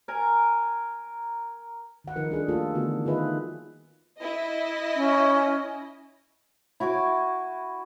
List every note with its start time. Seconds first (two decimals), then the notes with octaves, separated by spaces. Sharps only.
0.08 A#4 G#5 A#5
2.04 D#3 F#5
2.16 D#3 F3 D#4 A#4 B4
2.30 G3 D4 G#4 A4
2.48 A3 A#3 F4 G4 A4
2.74 D3 E3 A3 B3 F#4
3.06 D#3 F4 G#4 B4 D#5 E5
4.19 E4 D#5
4.96 C#4
6.80 E4 F#4 G#5 D6